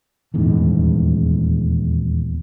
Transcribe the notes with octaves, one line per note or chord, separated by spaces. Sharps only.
D#1 E2 G#2